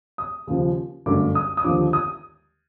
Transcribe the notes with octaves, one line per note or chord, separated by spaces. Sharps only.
D#6
D#2 C#3 F3
G1 F#2 D3 F#3 A3 D6
D#6
D#6
D#2 D3 F3 D6
D#6